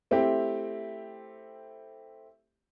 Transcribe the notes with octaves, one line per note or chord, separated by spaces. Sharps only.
A3 C4 E4 G4